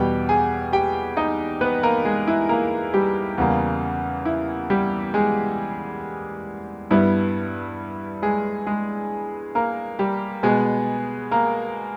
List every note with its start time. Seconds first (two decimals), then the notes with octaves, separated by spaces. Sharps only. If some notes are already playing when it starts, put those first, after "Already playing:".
Already playing: E2 B2 G3 G4 G5
0.29 G#4 G#5
0.73 G4 G5
1.17 D#4 D#5
1.61 B3 B4
1.83 A#3 A#4
2.05 G#3 G#4
2.27 E4
2.49 A#3 A#4
2.94 G3 G4
3.38 E2 C#3 G3 A#3
4.25 E4
4.70 G3 G4
5.14 G#3 G#4
6.91 G2 G3 B3 E4
8.22 G#3 G#4
8.66 G#3 G#4
9.55 A#3 A#4
9.99 G3 G4
10.43 B2 G#3 B3 G#4
11.31 A#3 A#4